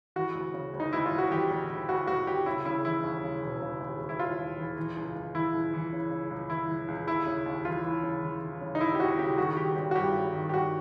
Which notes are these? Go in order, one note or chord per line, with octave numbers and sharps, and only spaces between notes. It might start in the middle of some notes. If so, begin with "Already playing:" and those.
E3 F#4
D2
C#3
D2
D#4
D2 E4
F4
D2
F#4
E3 G4
D2
D2
D2 F#4
D2 F#4
D2 G4
C#3 E4
C#3 E4
E3 E4
D#2
C#3
E1
C#3
D#2
D#2
E4
D#2 F4
D#2
E3
E3
C#2
C#2
E3 E4
C#2
E3
C#3
C#3
C#2
E3 E4
E3
C#2
D#2 E4
C#3
D#2
E3 F4
E3
C#3
E3
E3
C#3
D#4
D#2 E4
G4
D#2 F#4
C#3 G4
D#3 F#4
D#3 G4
G#1 G4
F#4
G2 G4
G#1
D#3
G4
D#3 F#4